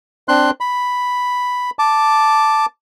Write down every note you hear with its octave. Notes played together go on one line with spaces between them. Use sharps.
C4 D4 C6 F#6
B5
A5 D6